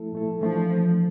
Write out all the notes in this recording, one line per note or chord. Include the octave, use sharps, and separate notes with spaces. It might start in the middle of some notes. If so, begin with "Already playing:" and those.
Already playing: F3 A3 E4 A4
A#2 F3 A3 E4 A4
E3 F3 A3 D4 A4